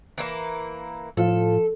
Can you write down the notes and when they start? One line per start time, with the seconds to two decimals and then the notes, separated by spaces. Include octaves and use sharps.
0.18 E3 A#3 E4
1.17 A2 F3 A4 F5